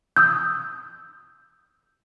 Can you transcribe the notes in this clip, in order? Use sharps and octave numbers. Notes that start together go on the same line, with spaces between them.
D#6 E6 G6